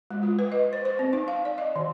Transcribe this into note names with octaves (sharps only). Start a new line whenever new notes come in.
G#3
F4
B4
D#5
C5
C5
C4
D#4
F5
D5
D#5
D#3